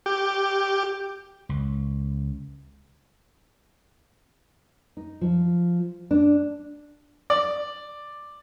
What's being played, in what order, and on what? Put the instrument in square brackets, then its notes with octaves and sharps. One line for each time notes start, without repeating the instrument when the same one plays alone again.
[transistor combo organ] G4
[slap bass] C#2
[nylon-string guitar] D#4
F3
D4
[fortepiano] D5